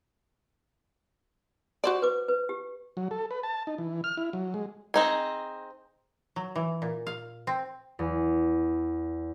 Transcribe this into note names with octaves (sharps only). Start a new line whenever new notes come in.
F#4 C5 D5
B4 D6
B4
G4
F#3
A4
B4
A5
D#4
E3
F6
E4
F#3
G#3
C4 D#4 G#4
F#3
E3
A#2
F5
C4
E2